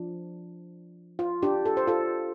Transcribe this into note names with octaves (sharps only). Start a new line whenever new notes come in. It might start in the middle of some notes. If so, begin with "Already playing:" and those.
Already playing: F3 D4
F4
D4 G4
A4
C5
F4 A4